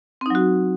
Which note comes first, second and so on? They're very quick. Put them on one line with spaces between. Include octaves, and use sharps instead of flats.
C4 D#4 F#3 F#4